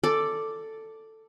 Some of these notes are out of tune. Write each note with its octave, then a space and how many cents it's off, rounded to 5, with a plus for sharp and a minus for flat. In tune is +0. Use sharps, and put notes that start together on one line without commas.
A4 +10 D5 +0